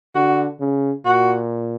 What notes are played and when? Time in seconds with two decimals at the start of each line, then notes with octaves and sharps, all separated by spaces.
0.15 D3 F#4
0.60 C#3
1.05 A#2 F#4